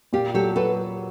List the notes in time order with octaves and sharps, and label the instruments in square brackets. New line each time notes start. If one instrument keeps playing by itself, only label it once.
[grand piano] A#2 [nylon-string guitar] F4 G4
[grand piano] F#3 [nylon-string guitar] G4 A4
[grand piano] F#3 [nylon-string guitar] A4 B4